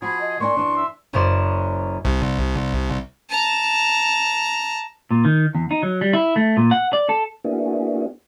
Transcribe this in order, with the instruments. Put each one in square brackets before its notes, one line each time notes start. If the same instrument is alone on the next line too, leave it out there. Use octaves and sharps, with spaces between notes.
[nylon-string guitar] F3 F#4 [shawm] G#4 [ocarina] B5
[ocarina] D#5
[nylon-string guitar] A#3 D4 G#5 [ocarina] C6 [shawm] C#6
[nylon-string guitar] F#2 E3 D4
[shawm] E5
[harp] F#1 F#2 C5 D5 E7
[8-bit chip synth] C2
[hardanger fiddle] A5 A#5
[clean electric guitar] A#2
D#3
E2
D#4
F#3
G3
E4
A3
A#2
F#5
D5
A4
[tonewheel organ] A#3 B3 D4 E4 F#4 G#4